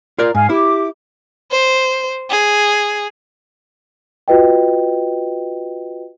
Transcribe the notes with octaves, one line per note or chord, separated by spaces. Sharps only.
F4 A#4 D5
G#2 F5 G#5
E4 G4 D6
C5
G#4
F4 F#4 B4 D#5 G5